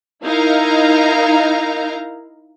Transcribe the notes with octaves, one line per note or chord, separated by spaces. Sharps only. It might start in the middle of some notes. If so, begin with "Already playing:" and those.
D#4 E4 A#4 F5 A#5